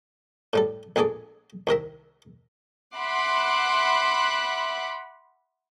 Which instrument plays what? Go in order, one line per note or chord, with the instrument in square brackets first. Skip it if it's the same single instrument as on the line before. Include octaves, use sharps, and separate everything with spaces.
[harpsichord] A2 G3 A4
A#1 G#3 G#4 A4 D5
C2 D#3 A#4 E5
[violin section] E5 F#5 B5 C6 D6 F#6